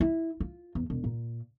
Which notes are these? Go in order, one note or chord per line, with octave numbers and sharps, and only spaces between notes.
E4
F4
E2
E1
A#2